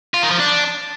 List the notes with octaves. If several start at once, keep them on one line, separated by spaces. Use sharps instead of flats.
F4
D#3
F3
D4